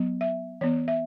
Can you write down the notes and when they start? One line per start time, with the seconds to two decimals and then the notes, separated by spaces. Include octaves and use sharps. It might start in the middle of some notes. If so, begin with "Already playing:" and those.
Already playing: F#3 B3
0.21 E5
0.61 E3 B3 C#5
0.88 E5